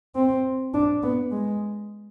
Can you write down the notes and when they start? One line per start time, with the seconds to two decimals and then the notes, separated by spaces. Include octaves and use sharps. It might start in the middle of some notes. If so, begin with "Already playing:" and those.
0.16 C4
0.74 D4
1.03 B3
1.32 G#3